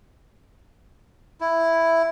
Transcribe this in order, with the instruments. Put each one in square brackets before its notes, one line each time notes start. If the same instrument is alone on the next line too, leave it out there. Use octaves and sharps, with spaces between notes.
[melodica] E4